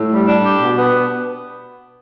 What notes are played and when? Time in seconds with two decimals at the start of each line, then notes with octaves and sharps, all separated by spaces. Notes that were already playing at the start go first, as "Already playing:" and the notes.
Already playing: A2
0.11 G3
0.26 D4
0.44 G4
0.60 B2
0.77 B3